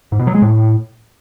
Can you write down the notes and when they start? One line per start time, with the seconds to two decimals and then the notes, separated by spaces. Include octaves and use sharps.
0.12 G#2
0.20 B2
0.27 F#3
0.35 G#3
0.42 A2